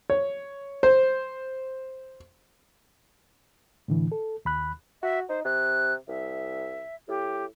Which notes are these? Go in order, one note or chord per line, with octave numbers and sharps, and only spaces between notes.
C#5
C5
A2 D3 E3
A4
D#2 B5 F#6
F#4 E5
D#4 C5
C3 F#6
C2 E5
A2 G4